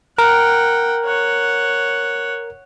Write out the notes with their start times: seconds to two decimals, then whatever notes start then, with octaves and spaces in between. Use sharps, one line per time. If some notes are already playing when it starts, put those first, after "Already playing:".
0.18 A#4 F#5 G5
1.05 C#5 F#5